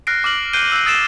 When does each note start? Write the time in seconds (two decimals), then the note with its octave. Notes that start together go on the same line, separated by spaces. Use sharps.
0.07 F6 F#6 A#6 C7 D7
0.24 D6 F6 F#7
0.53 F#6 G6 C7 D7 D#7 G7
0.72 E6 F#6 G6 C7
0.85 D#6 E6 A6 C7 D7 E7